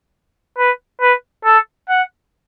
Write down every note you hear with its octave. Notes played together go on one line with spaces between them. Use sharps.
B4
B4
A4
F#5